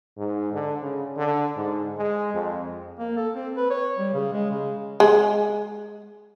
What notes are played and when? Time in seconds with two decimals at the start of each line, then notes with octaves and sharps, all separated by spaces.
0.17 G#2
0.53 D3
0.82 C#3
1.17 D3
1.56 G#2
1.98 G#3
2.34 F2
2.99 A#3
3.17 A4
3.35 C4
3.57 B4
3.71 C#5
3.98 G3
4.13 C#3
4.32 G#3
4.51 C#3
5.00 G#3